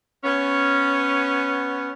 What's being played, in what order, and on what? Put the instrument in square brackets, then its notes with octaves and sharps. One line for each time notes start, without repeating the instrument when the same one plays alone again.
[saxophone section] B3 C#4